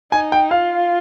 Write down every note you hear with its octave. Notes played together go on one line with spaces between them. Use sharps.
D#4 G#5
G5
F4 F5